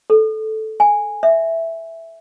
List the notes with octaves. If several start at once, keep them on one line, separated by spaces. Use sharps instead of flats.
A4
G#5
E5